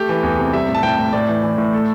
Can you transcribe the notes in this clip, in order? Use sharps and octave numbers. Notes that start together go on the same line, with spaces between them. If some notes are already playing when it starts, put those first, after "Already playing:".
Already playing: A3 G4
E3
E2
C3
G3 E5
A2
A5
A2 G5
A2
A2 D5
E3
E3
A2
A3 A4